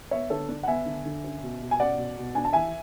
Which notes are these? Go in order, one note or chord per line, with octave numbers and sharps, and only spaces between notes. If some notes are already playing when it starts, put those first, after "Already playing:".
B3 C#5 E5
D3 A4 C#5
D4
F#5
B3 E5 G#5
D3
D3
C#4
B2
B2
G#5
C#4 D5 F#5
B2
B2
D4 G#5
A5
E3 E5 G#5